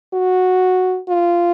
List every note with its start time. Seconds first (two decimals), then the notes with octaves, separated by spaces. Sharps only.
0.14 F#4
1.09 F4